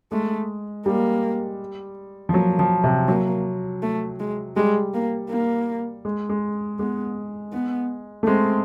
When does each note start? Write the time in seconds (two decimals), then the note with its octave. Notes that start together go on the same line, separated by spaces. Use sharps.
0.12 G#3 A3
0.86 G3 A#3
2.29 F3
2.34 F#3 A#3
2.59 F3
2.84 C3
3.08 F#3 A#3
3.82 A3
4.20 G#3
4.56 G3 G#3
4.94 A#3
5.30 A#3
6.05 G#3
6.29 G#3
6.79 G#3 B3
7.52 B3
8.23 A3
8.27 G#3 C4